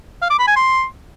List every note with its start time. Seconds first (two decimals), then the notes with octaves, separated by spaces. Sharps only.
0.22 F5
0.30 D6
0.39 B5
0.48 G#5
0.56 C6